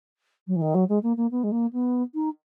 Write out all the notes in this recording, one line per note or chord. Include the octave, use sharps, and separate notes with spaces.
F#3
E3
D#3
F#3
G#3
A#3
A#3
B3
G#3
A#3
B3
D#4